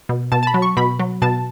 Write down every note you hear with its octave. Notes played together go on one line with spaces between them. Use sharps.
B2
B2 A5
A5
B5
F#3
C#6
B2 B5
F#3
B2 A5